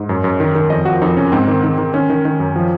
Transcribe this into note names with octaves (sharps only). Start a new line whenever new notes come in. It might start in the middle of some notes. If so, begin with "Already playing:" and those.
Already playing: G#2
F#2
F#2
D#3
D#3
F2 D#5
F3 F#4
F2 D#4
C#3 C#4
G#2 C4
D#3
D#3
D#3
D#3 C#4
D#3
D#3
F#2
F3